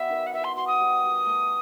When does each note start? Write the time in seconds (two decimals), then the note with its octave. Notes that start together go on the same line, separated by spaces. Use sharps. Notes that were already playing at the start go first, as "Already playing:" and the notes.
Already playing: G3 B3 F#4 E5
0.09 D#3
0.27 F#5
0.33 E3 E5
0.44 C6
0.56 F#4 C6
0.67 D#6
0.79 G3
1.02 G3
1.25 A3